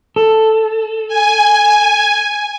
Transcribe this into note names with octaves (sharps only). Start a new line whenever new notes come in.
A4
G#5